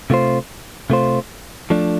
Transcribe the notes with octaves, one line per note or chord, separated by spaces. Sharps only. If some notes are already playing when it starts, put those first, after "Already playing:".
C3 A3 F4 C5
C3 A3 F4 C5
F3 A3 D4